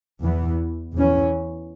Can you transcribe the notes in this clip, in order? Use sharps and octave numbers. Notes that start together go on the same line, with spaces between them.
E2 E3 B3
E2 E3 C#4